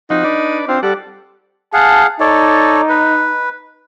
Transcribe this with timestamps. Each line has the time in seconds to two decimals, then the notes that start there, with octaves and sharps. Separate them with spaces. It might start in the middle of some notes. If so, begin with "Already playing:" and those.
0.10 F3 C4 D#4 F#4
0.24 D4 B4 D5
0.68 C4 D4 F4
0.83 G3 A4 D5 F#5
1.73 G#4 F5 F#5 A5
2.20 D#4 A4 C#5 D5
2.89 B4